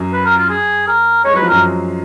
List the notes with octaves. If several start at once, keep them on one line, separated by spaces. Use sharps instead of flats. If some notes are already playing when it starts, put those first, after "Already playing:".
Already playing: F#2 F#3
B4
A#4
F4
G#4
A#4
G#3 C#5
F#3 B4
F3
F#2 F#3 A#4